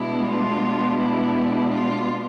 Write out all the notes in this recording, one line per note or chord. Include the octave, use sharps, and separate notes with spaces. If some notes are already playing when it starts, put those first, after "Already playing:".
Already playing: B2 G#3 B3 D4 E4
F4
E4
F4